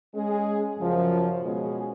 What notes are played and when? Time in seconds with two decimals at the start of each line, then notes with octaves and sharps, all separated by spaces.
0.13 G#3 C#4 G#4
0.78 F#2 C#3 F3
1.43 B2 G#3 C#4 G#4